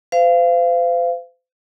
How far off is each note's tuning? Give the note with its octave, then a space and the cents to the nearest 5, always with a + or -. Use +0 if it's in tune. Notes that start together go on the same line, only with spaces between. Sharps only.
C5 -40 F5 -20